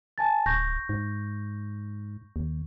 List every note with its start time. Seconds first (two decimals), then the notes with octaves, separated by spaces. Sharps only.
0.18 G#5 A5 A6
0.46 D1 C#6 G6 A#6
0.89 G#2
2.36 D#2